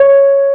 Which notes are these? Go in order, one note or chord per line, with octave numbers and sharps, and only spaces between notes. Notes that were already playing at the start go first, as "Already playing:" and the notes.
Already playing: C#5